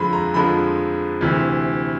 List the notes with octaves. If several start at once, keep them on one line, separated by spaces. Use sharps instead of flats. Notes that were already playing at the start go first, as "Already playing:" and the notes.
Already playing: F2 D3 F3 G#3 B5 C6
A#5
F2 D3 F3 G#3 B5
D2 C3 E3